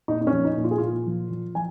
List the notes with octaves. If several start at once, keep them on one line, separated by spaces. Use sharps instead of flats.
A#2 D#4
D#4
C#4
F3
D#4
A#2
F4
G#4
A#2 F4
F3
F3
F3 G#5